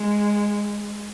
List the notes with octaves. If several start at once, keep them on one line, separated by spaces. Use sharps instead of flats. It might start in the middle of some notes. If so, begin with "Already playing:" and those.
Already playing: G#3